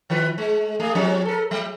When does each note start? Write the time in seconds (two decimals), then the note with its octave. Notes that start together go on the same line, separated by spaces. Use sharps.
0.10 D#3 F3 B4
0.38 G#3
0.80 A3 G#4
0.95 F3 C4 C#4
1.25 A4 A#4
1.51 F#3